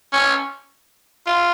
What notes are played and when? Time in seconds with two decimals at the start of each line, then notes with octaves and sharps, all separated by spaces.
0.13 C#4
1.27 F4